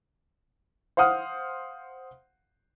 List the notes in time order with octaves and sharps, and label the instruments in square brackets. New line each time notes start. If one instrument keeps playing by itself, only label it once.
[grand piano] C5 F5 F#5 D#6 F6